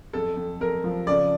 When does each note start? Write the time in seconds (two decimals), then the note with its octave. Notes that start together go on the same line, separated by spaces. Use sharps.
0.13 F2 A4
0.37 F2
0.60 F2 A#4
0.84 F3
1.07 C#3 D5